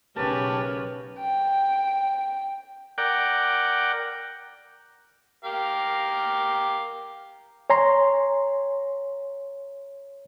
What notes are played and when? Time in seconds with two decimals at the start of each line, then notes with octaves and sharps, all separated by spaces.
0.16 B1 C#3 C#4 G4 A#4 B4 C#5 A5
1.18 G5
2.98 A#4 D5 F#5 G5
5.45 G4 A#4 F5
7.70 C#5 G#5 A#5 C6